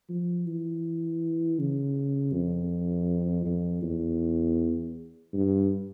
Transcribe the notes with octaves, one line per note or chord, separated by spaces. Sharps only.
F3
E3
C#3
F2
F2
E2
G2